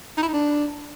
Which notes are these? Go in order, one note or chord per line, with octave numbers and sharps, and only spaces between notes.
D#4
E4
D#4
D4